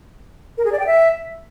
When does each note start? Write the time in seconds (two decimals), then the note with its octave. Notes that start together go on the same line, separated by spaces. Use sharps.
0.58 A#4
0.65 G#4
0.72 D5
0.79 G5
0.87 E5